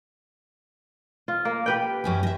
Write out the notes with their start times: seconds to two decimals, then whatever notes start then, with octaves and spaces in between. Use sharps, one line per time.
1.28 F4
1.45 A#3
1.66 G4 B4 G5
2.04 F#2 C#4 G#4
2.23 D#5 E5